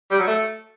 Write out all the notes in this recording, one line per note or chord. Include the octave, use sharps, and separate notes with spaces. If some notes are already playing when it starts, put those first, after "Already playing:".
G3
F#3
A3